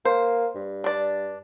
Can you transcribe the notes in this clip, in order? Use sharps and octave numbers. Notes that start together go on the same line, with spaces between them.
A#3 C5
G2
D4 D5